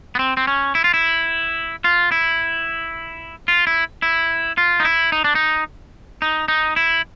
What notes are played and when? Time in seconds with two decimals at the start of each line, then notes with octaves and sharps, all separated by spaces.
0.15 B3
0.19 C4
0.37 C4
0.47 C#4
0.75 E4
0.84 F4
0.94 E4
1.84 F4
2.12 E4
3.48 F4
3.67 E4
4.02 E4
4.58 F4
4.80 D#4
4.85 E4
5.12 D#4
5.24 D4
5.35 D#4
6.22 D#4
6.48 D#4
6.76 E4